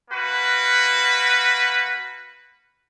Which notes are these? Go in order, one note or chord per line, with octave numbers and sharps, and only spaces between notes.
A#3 F#4 B4